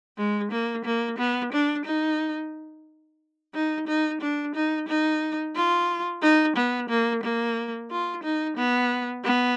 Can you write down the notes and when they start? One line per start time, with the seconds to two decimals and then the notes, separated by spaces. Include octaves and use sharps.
0.18 G#3
0.52 A#3
0.85 A#3
1.19 B3
1.53 D4
1.85 D#4
3.54 D#4
3.88 D#4
4.21 D4
4.55 D#4
4.88 D#4
5.55 F4
6.22 D#4
6.56 B3
6.89 A#3
7.23 A#3
7.91 F4
8.24 D#4
8.57 B3
9.24 B3